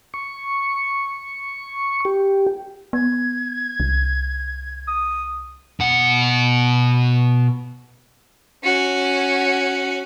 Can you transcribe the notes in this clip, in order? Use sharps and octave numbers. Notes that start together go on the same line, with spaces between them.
C#6
G4
B3 G#6
C2
D#6
B2 F#5
C#4 F#4